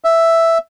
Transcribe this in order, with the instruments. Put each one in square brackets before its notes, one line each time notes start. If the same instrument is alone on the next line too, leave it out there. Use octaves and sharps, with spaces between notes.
[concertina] E5